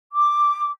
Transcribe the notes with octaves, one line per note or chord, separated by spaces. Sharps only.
D6